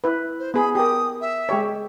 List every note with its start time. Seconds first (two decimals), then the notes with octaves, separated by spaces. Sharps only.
0.04 E4 B4
0.39 C5
0.54 B3 G#4 B5
0.75 G4 A#4 D#6
1.21 E5
1.49 G#3 G4 C#5